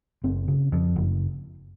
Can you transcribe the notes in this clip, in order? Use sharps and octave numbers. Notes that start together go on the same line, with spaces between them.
F#1 C4
C#3
F2
F#1